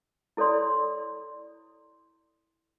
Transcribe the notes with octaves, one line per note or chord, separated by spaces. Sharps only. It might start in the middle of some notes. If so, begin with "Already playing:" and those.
E4 A4 C#5 D5 C6